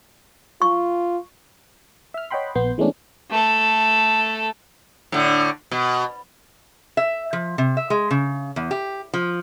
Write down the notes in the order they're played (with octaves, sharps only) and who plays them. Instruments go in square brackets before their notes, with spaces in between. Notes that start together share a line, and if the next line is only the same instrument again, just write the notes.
[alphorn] F4 [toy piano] C#6
[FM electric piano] E5 F6
C#5 D#5 F#5 G5 B5 C6
A#1 B3 C6 G6
E3 G#3 A3 B3 C#4 D4
[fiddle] A3 A4
[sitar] A2 D3
B2
[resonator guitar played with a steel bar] E5
F3
C3
E5
G#3
C#3
E2
G4
F3